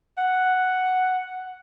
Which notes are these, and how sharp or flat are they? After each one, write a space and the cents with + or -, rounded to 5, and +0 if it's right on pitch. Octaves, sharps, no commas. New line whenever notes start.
F#5 +0